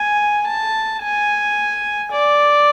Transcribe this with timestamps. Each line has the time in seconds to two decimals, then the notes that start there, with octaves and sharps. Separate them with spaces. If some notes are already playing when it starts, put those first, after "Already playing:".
Already playing: G#5
0.47 A5
1.03 G#5
2.12 D5